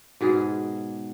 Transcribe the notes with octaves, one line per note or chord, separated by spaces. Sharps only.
G#2 B2 G#4